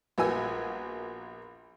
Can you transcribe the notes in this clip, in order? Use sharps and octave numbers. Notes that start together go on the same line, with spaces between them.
A#1 B3 F#4 G#5 E6